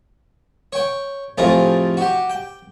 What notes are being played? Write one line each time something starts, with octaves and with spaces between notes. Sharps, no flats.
C#5 G5
F2 A2 C3 F4 G#4 A#5
F#4 G4
G5